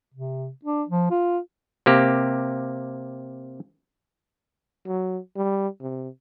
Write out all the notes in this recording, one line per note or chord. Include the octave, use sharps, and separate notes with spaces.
C3
D4
F3
F4
C3 A#3 G4
F#3
G3
C3